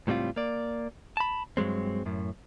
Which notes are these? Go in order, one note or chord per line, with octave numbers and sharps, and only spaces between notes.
C#2 A2 G3 C4 F4
A#3 D5
A5 B5
G2 F#3 G#3 C4
F#2 A2